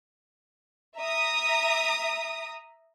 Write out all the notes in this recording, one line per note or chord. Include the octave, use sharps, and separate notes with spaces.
E5 A#5 D#6